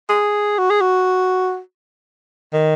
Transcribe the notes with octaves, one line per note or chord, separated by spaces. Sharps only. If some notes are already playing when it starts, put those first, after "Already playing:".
G#4
F#4
G#4
F#4
D#3